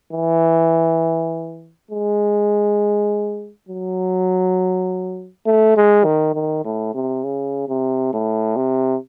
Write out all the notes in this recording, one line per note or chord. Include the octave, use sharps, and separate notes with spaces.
E3
G#3
F#3
A3
G#3
D#3
D#3
A2
C3
C#3
C3
A2
C3